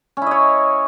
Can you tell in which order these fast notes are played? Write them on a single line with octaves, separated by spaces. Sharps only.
C#4 E4 D#5 C#5